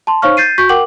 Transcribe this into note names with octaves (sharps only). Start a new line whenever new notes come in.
A5 C6
D#4 C5 C#5 F5 C#6 F6
G6 A6 C7 D#7
F#4 C#6 G6 B6
A#4 F#5 G5 D6 F#7